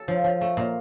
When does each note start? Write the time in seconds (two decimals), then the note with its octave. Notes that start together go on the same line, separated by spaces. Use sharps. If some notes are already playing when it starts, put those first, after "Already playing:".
Already playing: A4
0.08 F3
0.24 F3
0.41 A3
0.57 A#2